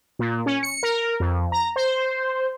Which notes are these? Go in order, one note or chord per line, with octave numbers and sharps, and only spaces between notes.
A#2
C#4
C#7
A#4
F2
A#5
C5